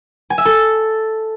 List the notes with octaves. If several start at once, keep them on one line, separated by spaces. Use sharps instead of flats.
G#5
E5
A4